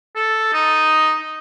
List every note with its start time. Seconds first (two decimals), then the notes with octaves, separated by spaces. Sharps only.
0.16 A4
0.53 D#4